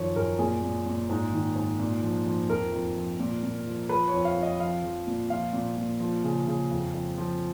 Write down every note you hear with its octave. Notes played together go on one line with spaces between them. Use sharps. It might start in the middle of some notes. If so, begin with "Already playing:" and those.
Already playing: F#2 D#3 F3 C#5
F#2 A#4
A#2 G#4
A#2
A#2
G#2
D#3
G#2
A#2
F3
F3
F2 A#4
F2
F3
A#2
A#2
F3
F3 B4
C#5
F2
F5
F2
D#5
F3 F5
F3
A#2
F3 F5
A#2
A#2
F3
C#3
C#3
F2
F2
F3